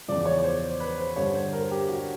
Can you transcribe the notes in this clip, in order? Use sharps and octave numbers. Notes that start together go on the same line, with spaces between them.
E2 C#3 F3 D5
C#5
C5
B4
C5
G2 D3 G3 C#5
C5
A#4
G4
F#4